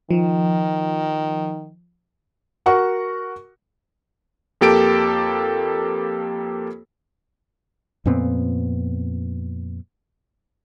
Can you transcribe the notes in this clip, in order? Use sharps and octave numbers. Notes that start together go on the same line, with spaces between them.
D#3 F3
F#4 A#4 F#5 C#6
F2 A#3 G4 A4 D7
F2 A#2 B3 C4